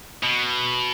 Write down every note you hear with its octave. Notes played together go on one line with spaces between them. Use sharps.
B2